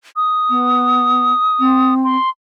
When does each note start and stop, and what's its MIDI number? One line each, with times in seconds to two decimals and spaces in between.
0.16 1.94 87
0.49 1.32 59
1.59 2.15 60
2.04 2.29 84